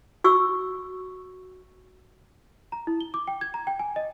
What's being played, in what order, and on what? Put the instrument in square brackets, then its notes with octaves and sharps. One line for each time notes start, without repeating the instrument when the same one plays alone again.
[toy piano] F#4 C#6 E6
[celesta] A#5
E4
G7
D6
G5
G#6
A#5
G5
G#5
D#5